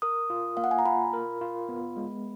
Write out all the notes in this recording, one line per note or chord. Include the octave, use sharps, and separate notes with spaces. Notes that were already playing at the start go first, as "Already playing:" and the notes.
A#4 D#6
F4
A#3 F5
F#5
G#5
A#5
F4 B5
A#4
F4
B3
G#3